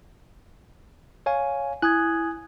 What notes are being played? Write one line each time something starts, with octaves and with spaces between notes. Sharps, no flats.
C#5 F5 G#5
E4 G#5 D#6 F#6 G#6